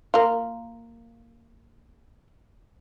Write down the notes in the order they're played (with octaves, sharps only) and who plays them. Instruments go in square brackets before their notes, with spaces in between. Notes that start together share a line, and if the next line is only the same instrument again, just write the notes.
[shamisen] A#3 F4